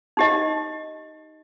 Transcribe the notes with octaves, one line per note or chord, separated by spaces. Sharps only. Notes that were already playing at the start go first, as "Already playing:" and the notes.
D#4 G4 D#5